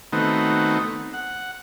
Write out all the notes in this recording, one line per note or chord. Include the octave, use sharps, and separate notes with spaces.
D#3 A3 B3 C4 D#4 F#4
F#5